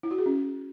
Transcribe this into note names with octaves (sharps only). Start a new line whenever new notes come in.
E4
F#4
G#4
C#4